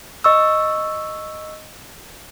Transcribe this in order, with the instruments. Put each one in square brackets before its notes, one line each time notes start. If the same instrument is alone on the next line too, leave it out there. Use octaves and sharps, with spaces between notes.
[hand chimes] D#5 C#6 E6